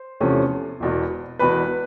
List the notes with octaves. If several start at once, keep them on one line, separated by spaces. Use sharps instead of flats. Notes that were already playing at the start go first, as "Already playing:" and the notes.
Already playing: C5
E2 C3 F3 A3 C#4
E1 E2 B2
E1 E2 B2 B4 B5